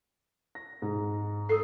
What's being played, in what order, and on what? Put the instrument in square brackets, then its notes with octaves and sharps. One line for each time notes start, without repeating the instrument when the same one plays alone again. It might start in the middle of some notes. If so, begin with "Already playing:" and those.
[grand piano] A#6
G#2
[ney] A4 [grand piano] D#6 C7